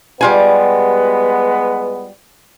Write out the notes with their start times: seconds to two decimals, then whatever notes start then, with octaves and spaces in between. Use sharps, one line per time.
0.21 G3 G#3 B3 F4 G#5